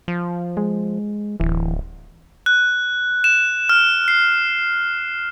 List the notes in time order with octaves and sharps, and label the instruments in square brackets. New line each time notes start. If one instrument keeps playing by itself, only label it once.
[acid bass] F3
[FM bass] G#3
[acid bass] D1 [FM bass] E3
[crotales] F#6
E7
F6
C7